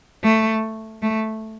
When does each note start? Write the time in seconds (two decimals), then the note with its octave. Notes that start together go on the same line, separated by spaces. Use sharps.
0.24 A3
1.02 A3